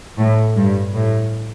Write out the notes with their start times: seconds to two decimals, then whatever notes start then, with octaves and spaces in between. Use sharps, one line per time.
0.17 A2
0.56 G2
0.94 A2